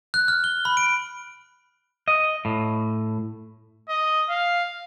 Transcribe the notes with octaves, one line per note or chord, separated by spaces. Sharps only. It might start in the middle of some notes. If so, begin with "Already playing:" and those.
F#6
F6
G7
B5
D7
D#5
A2
D#5
F5